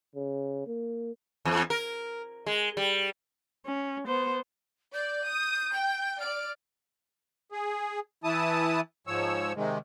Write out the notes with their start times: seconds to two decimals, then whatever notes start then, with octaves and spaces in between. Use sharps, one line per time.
0.15 C#3
0.67 A#3
1.45 E2
1.70 A#4
2.46 G#3
2.77 G3
3.66 C#4
4.07 B3 C5
4.94 D5 G6
5.27 D#6
5.74 G5
6.20 D5 F6 D7
7.52 G#4
8.24 E3 E4 A5 D#6
9.07 G#2 F3 C#5 E6
9.56 C3 D#3 G#3